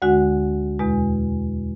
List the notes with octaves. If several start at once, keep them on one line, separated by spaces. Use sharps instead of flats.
D2 D3 G#3 F#4 F#5
E2 B2 G#3